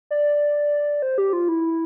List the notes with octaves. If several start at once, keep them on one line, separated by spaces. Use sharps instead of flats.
D5
C5
G4
F4
E4